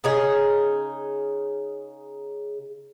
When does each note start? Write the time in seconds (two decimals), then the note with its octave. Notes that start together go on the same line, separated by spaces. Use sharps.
0.04 C#3 D#4 G#4